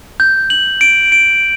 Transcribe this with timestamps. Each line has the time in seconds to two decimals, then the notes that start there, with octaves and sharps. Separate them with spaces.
0.20 G6
0.50 F#7
0.81 D7
1.12 D7